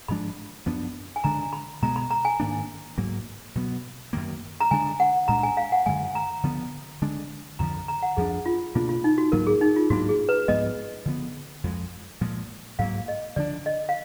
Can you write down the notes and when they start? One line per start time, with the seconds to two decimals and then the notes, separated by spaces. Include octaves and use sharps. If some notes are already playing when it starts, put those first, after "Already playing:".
0.08 G#2 F3 G#3 D4 B5
0.66 F#2 F3 B3 D4
1.16 G#5
1.24 D3 G#3 D4 A#5
1.53 B5
1.82 B2 G#3 B3 A#5
1.96 B5
2.11 A#5
2.25 G#5
2.40 G#2 D#3 A#3 D4
2.98 G#2 F#3 A#3
3.55 B2 F#3 B3
4.13 F#2 D#3 A#3
4.60 A#5
4.71 D3 G#3 D4 G#5
5.00 F#5
5.28 A#2 G#3 D4 A#5
5.43 G#5
5.57 F5
5.72 F#5
5.86 F#2 D3 G#3 G#5
6.15 A#5
6.43 D3 F3 B3
7.02 D3 G#3 D4
7.59 F2 D3 F3 A#5
7.74 B5
7.88 A#5
8.03 F#5
8.17 F2 F3 A#3 D4 G#4
8.46 F4
8.75 B2 A#3 D4 F4
8.89 F4
9.04 D#4
9.18 F#4
9.32 G#2 F#3 A#3 A#4
9.47 G#4
9.61 D#4
9.76 F4
9.90 G#2 F#3 A#3 D4 F#4
10.09 G#4
10.29 B4
10.48 G#2 F3 G#3 B3 D#5
11.06 D3 F3 B3
11.64 F2 F3 G#3
12.21 A#2 F3 G#3
12.79 G#2 F#3 A#3 F5
13.08 D#5
13.36 D3 F3 B3 D4 D5
13.66 D#5
13.89 F5